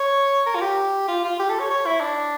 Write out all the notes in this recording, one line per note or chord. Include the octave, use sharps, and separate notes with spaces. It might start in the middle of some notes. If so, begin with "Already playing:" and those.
Already playing: C#5
A#4
F4
G4
F4
F4
G4
A4
C#5
C#5
E4
D4